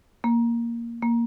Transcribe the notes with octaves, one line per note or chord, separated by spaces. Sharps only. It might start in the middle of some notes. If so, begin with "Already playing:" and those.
A#3
A#3